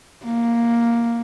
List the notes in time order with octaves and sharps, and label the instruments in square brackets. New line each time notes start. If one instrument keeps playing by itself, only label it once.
[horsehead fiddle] A#3